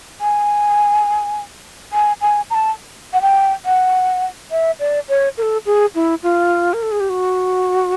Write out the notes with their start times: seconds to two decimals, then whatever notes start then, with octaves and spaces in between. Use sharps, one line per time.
0.21 G#5
1.93 G#5
2.21 G#5
2.50 A#5
2.55 A5
3.13 F#5
3.22 G5
3.65 F#5
4.51 E5
4.80 D5
5.09 C#5
5.38 A#4
5.42 A4
5.66 G#4
5.95 E4
6.23 F4
6.74 A#4
6.82 A4
6.92 G#4
7.00 G4
7.10 F#4